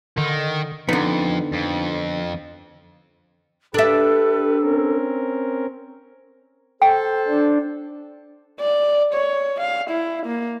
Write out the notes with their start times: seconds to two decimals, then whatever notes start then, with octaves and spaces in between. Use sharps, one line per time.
0.18 D3 D#3
0.89 F2 D3 B3 D#4
1.54 F2
3.74 D4 G4 A4 B4 E5
4.62 C4 C#4 A#4
6.82 A4 C5 G5
7.28 D4
8.60 D5
9.14 C#5
9.61 F5
9.90 E4
10.26 A#3